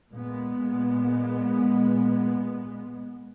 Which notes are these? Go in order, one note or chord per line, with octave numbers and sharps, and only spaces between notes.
A#2 G#3 B3